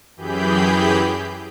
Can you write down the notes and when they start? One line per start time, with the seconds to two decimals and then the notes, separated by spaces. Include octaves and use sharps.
0.16 F#2 E3 G4 G#4 B5 G6